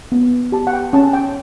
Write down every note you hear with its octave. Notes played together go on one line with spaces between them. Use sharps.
B3
G4 A5
F#5
G5
C#4 A5
G5